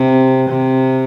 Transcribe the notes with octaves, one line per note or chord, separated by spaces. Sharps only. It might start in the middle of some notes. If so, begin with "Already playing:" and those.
Already playing: C3
C3